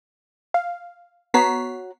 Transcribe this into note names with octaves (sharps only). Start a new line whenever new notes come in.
F5
B3 F#4 C#5 A#5 B6 C7